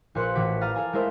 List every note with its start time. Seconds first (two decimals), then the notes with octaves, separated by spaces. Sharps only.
0.15 A#1 A#2 B4 C6 F#6 C#7
0.35 A1 E3 F#4 D6 B6 D7
0.61 F5 A#5 F6 A6 D#7
0.74 A4 F5 G#5 A#5
0.93 G#3 A3 E4 A#4 C5 E5